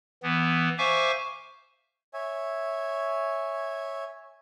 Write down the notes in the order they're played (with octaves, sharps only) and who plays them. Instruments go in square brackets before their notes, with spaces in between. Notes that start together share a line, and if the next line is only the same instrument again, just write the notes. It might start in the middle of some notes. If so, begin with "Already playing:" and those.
[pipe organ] E3 B3
C5 E5 F5 G#5 C#6 D6
[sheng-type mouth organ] C#5 E5 G#5